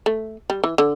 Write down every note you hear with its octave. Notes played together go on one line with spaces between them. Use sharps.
A3
G3
E3
D3